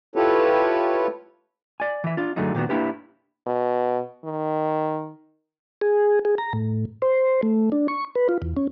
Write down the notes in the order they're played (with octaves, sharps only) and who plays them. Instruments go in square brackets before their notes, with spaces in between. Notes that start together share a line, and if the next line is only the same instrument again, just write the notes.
[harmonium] E4 F4 G4 A4 B4 C#5
[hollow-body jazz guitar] D5 G#5
E3 E5
D4 F4
F#2 D3 F#3 G#3 A3 D#4
A#2 D#3 B3 F#4
A#3 D4 E4 G4 B4
[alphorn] B2
D#3
[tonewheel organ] G#4
G#4
A#5
A2
C5
A3
D4
C#6
B4
F4
E2
C#4